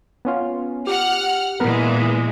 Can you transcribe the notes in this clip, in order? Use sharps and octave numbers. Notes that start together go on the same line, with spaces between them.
B3 C#4 F4
G4 F#5 F6
A#2 E3 G#3 B3 A#4 B4